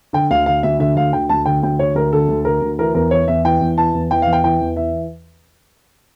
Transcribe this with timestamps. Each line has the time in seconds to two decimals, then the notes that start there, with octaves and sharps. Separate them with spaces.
0.13 D3 G5
0.31 D2 F5
0.46 D3 F5
0.63 D2 E5
0.80 D3 E5
0.96 D2 F5
1.13 D3 G5
1.29 D2 A5
1.46 D3 G5
1.63 D2 G5
1.79 D3 C#5
1.95 D2 A#4
2.13 D3 A4
2.28 D2
2.45 D3 A#4
2.61 D2
2.79 E3 A#4
2.95 E2 A#4
3.11 E3 C#5
3.28 E2 E5
3.45 E3 G5
3.61 E2
3.77 E3 A5
3.94 E2
4.11 E3 G5
4.22 E2 F5
4.33 G5
4.44 E3 G5
4.61 E2
4.77 E3 E5